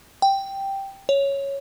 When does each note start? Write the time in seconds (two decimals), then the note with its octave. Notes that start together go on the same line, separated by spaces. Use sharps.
0.22 G5
1.09 C#5